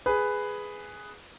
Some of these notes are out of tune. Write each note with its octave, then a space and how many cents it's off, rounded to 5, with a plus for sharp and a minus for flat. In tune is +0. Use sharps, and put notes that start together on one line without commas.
G#4 +0 B4 +5